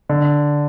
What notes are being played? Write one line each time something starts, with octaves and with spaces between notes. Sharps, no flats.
D3